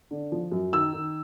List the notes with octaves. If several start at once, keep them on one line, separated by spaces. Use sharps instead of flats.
D3
F3
F#2
D#3 E6
D#3